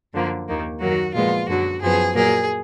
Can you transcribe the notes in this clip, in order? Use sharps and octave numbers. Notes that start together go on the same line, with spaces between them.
F#2 D3 F3 A#3
D#2 D#3 A#3
F#2 D#3 F#3 A#3 F#4
A#2 F3 G#3 B3 F4
F#2 D3 F#3 F#4
F#2 F3 B3 G#4
A#2 F#3 A#3 G#4